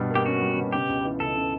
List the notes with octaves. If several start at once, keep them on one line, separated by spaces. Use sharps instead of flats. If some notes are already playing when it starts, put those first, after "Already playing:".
Already playing: G2 B2 G3
A#3
G4
C#4 F#4
G3
B2
C#3 G4
C#2
E3
C#2 A4
C#3